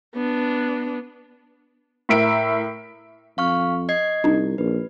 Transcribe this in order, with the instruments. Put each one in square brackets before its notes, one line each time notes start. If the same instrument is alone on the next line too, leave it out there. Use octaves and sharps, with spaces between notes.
[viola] B3 D4
[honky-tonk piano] A2 A#4 E5 D7
[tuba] F2 [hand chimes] F5 C#6 F6
[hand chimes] D#5 G#6 C7
[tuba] C2 [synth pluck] D4 D#4
[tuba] A#1 [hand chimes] B4